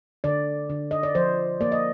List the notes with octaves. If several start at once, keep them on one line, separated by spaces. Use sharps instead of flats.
D3 D5
D3
D#5
D5
F3 C5
A#3 D5
D#5